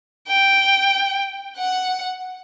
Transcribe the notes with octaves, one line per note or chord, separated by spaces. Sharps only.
G5
F#5